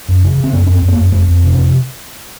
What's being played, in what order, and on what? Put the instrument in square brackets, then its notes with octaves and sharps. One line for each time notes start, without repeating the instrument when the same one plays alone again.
[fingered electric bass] F#2
C#3
C#3
C4
F#2 B3
F#2 C#4
C4
F#2
B3
A#3
F#2
F2 A3
F2
C3 C4
C#4
F2